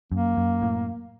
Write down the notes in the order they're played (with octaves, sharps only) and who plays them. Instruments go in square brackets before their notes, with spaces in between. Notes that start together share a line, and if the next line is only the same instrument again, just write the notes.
[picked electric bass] F#2 [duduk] A#3
[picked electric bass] F#2
A2